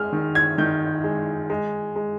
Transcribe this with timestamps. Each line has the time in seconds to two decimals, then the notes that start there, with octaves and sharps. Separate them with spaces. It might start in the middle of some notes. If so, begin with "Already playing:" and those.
Already playing: G#3 F6
0.13 D#3
0.35 G#6
0.58 D#3 G6
1.04 G#3
1.50 G#3
1.96 G#3